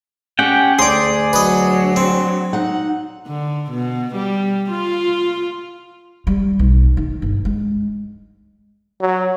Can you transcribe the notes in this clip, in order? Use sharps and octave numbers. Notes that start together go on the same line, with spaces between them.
C#4 G4 F#5 G5
D2 G#4 D5 C6 D6
F#3 D4 B4 D#5
C4
D#4 F#5
D3
B2
G3
F4
G3
B1
C#4
D#3
G1
G#3
F#3